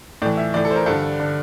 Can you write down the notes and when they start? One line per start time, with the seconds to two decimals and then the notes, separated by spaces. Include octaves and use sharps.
0.22 A2 D5
0.26 E3
0.37 E5
0.54 A2 E3 D5
0.65 A4
0.71 C5
0.76 A#4
0.86 G2 D3 A4
1.20 D3